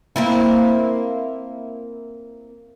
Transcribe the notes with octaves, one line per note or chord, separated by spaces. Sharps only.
A#3 C4 E4